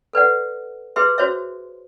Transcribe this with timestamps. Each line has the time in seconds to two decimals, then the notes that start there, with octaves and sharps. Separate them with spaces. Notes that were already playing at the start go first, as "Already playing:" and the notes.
0.13 A4 B4 D5 F#5
0.96 G4 G#4 B4 E5 C6
1.18 F#4 C5 C#5 E5